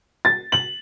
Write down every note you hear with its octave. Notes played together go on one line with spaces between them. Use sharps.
A6
F#7